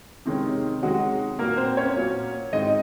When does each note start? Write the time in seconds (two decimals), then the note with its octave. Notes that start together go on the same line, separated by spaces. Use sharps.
0.25 C3 D#3 G#3 C#4
0.82 C3 D#3 F#3 G#3 C#4 F#4
1.39 A#2 F#3 A#3 A#4
1.57 C4 C5
1.77 C#4 C#5
1.96 A#2 F#3 A#3
2.53 G#2 D#3 G#3 C4 D#4 D#5